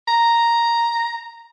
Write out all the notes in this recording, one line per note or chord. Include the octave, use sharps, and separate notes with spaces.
A#5